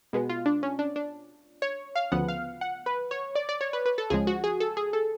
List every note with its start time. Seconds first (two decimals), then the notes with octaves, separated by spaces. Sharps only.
0.13 B2 G#3 B3
0.29 F4
0.46 D4
0.63 C#4
0.79 D4
0.96 D4
1.62 C#5
1.95 F5
2.12 D2 C#3 F3 B3 F#5
2.28 F5
2.61 F#5
2.86 B4
3.11 C#5
3.35 D5
3.49 D5
3.61 C#5
3.73 B4
3.86 B4
3.98 A4
4.10 C#2 C#3 F3 G#3 G#4
4.27 F#4
4.44 G#4
4.60 A4
4.77 G#4
4.93 A4